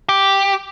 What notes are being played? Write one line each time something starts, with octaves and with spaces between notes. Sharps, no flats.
G4